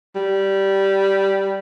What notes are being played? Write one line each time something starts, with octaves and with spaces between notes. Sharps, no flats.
G3